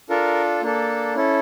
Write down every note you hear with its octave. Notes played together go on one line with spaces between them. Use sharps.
D4 F4 A4 A#4
A#3 D4 A4
C#4 E4 A4